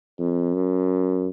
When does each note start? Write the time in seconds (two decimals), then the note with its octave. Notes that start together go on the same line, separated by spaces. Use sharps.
0.19 F2
0.55 F#2